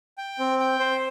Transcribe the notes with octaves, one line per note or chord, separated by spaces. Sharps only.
G5
C4
G5
C5